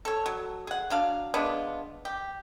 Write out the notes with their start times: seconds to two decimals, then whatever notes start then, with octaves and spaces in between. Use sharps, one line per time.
0.05 A4 C#5
0.26 F#3
0.67 G#4 F#5
0.90 F#3 D4 F5
1.34 G#3 B3 D4 F4
2.05 G4